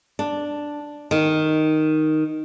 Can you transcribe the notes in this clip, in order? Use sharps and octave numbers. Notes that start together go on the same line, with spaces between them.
D4
D#3